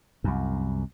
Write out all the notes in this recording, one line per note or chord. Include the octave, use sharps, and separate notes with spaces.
C2 F#2